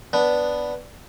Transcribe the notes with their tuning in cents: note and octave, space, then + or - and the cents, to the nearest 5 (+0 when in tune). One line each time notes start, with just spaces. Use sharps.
B3 +0 D4 +0